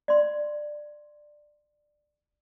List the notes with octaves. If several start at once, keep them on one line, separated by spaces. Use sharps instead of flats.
D5 C6